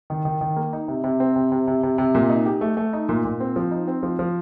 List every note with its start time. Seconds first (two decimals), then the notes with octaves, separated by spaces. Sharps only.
0.10 D#3
0.25 D#3
0.41 D#3
0.56 A#3
0.73 D#4
0.88 C3
1.04 C3
1.20 C4
1.36 C3
1.52 C3
1.67 C3
1.83 C3
1.98 C3
2.15 A#2
2.29 D#4
2.46 G4
2.61 A3
2.77 A3
2.93 D#4
3.09 A#2
3.25 A#2
3.40 C4
3.56 F3
3.71 D#4
3.88 C4
4.03 F3
4.19 F3